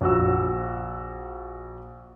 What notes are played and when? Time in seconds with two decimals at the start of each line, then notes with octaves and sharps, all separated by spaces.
0.01 A#1 F#4 E6